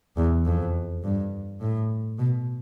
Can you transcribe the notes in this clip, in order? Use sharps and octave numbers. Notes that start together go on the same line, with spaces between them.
E2
F2
G2
A2
B2